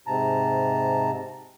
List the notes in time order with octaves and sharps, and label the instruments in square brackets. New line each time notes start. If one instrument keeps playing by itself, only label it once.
[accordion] G#2 C3 A5 A#5